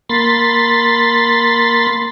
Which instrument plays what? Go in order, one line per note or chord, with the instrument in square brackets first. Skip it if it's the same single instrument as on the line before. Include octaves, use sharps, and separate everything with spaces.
[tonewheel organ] A#3 B5 C6 A6